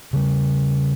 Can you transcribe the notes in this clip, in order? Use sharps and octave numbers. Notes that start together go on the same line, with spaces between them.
C#3 G3